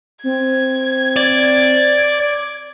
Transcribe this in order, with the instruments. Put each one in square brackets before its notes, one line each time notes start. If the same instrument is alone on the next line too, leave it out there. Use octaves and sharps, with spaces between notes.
[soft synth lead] C4 [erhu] G#6
[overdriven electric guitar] D5
[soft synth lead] D6